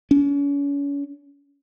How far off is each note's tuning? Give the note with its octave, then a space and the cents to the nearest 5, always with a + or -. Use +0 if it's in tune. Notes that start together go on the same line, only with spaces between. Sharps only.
C#4 +35